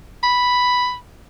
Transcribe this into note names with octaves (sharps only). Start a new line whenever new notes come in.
B5